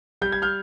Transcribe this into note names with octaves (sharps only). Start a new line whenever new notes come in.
G3 G6
G#6
F6 G6